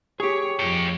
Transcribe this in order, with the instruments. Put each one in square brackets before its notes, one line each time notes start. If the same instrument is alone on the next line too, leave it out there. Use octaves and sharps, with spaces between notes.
[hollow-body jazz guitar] G4 G#4 [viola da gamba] C#5
[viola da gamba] F2 [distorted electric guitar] C#5 G5